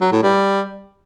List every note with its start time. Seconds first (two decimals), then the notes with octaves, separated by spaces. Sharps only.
0.01 F#3
0.12 A2
0.23 G3